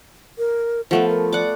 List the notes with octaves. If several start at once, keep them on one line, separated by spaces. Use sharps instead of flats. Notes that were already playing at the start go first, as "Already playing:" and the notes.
A#4
F3 A3 B3 F#5
A#4
D5 F#5 D6